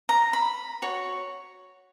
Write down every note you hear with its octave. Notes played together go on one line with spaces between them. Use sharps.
A#5
B5
F#4 C#5